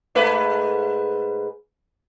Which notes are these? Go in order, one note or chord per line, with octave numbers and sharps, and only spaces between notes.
G#2 A3 B4